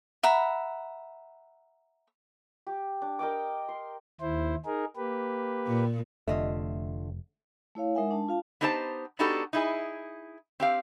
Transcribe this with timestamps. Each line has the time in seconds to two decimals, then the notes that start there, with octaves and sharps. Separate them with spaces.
0.23 E5 F#5 A#5 B5
2.67 G4
3.02 D4
3.19 A#4 D#5 G5 D6
3.69 C6
4.21 D#2 E4 C5
4.65 D#4 G#4 A#4
4.96 A#3 G4 B4
5.66 A#2
6.28 F1 D3 A3 F4 D#5 E5
7.75 A3 E4 C#5 F5
7.95 G#3 D#4 A#4 E5 F#5 G#5
8.11 D4 A5
8.29 F4 F5 A5
8.61 B3 D#4 G4 C5 D5 A5
9.19 B3 D4 D#4 F#4 G4 A4
9.53 D#4 E4 G#4
10.60 C4 G4 F5